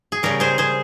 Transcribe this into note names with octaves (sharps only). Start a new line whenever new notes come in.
G#4
C#3 G3 G4 A#4
G#4 C5
G#4 C5